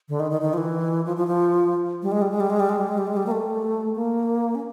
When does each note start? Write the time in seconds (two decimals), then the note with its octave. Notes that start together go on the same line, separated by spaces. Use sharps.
0.09 D3
0.20 D#3
0.31 D#3
0.41 D#3
0.54 F3
0.58 E3
1.06 F3
1.16 F3
1.27 F3
2.02 G3
2.12 G#3
2.22 G3
2.31 G#3
2.40 G3
2.50 G#3
2.60 G3
2.69 G#3
2.79 G3
2.88 G#3
2.98 G3
3.07 G#3
3.17 G3
3.27 A#3
3.31 A3
3.96 A#3
4.55 C#4